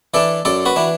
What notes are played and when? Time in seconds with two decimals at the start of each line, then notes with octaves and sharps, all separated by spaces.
0.14 E3 D4 A4 D5
0.45 F#2 A4 D5
0.66 F#4 B4
0.76 E3 D4